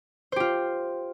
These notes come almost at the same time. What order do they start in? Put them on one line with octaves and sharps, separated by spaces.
C5 G4 F4